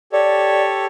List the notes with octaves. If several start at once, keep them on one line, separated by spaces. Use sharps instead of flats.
G4 A4 C#5 D5